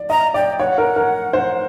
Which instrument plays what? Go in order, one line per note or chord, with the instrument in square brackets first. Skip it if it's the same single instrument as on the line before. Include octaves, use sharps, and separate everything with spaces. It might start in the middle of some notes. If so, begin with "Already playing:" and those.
Already playing: [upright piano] D5
[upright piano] D#5 [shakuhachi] A#5
[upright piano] D5 [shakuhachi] G5
[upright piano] C#5 [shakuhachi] F#5
[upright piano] A#4
A#4
C5